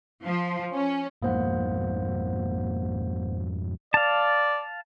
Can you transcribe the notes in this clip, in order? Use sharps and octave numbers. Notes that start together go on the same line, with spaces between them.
F3
C#4
F2 G#2 B2 A#3 C5 F#5
D5 F5 A5